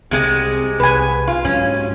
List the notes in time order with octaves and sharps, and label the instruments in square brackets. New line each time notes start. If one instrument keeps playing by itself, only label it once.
[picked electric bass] C2 C4 [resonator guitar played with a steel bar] C3 G#3
[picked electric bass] C2 [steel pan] B4 G#5
[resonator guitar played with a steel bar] F4
[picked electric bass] G#2 F#3 [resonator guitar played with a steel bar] C#4